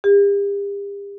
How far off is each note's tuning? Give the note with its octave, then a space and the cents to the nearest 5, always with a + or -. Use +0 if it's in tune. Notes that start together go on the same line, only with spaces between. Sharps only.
G4 +40